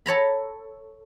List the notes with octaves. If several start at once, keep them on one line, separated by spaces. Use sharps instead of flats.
A4 C#5 A#5 B5